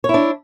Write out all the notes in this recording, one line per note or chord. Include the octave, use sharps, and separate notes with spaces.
D4 E4 C#5